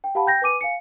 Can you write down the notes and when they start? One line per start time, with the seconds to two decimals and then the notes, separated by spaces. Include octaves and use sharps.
0.04 G5
0.15 G4 F5 F#5 A5 B5
0.27 G5 G6 A#6
0.42 B4 G#5 D6 D#7
0.61 F5 G#5 C#7